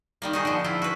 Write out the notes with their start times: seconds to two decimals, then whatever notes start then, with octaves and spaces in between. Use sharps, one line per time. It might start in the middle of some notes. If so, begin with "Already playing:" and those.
0.22 D#3 G3 A#3
0.33 D#4 F#4 G#4
0.45 D3 F3
0.64 E4 F4
0.82 F#4 B4